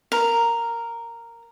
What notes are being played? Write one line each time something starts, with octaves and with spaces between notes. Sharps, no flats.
A#4